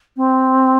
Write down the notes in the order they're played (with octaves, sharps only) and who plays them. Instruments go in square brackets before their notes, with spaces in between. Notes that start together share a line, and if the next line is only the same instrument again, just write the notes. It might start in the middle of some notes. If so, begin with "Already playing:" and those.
[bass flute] C4